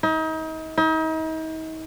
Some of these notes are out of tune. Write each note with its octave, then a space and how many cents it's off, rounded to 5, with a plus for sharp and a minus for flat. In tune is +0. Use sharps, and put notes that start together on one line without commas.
D#4 +35
D#4 +40